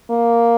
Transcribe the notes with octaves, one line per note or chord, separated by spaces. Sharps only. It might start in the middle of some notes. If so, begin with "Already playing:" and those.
A#3